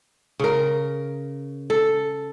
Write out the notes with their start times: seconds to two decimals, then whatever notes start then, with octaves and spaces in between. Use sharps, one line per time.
0.39 C#3 A#4
1.70 A4